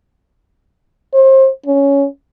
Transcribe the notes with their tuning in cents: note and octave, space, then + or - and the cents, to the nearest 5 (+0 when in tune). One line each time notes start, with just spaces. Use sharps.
C5 +30
C#4 +10